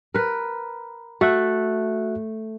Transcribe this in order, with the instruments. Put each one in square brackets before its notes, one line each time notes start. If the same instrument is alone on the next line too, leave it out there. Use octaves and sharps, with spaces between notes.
[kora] A#4 B4
[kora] A3 [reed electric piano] F#4 E5 F#6